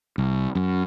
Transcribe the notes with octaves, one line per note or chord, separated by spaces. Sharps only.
C2
F#2